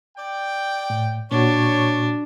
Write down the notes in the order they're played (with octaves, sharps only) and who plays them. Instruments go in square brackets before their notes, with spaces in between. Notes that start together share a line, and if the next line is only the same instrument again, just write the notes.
[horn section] D5 G5
[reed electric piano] A2
[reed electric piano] A#2 F#4 [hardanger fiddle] D4 [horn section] C#5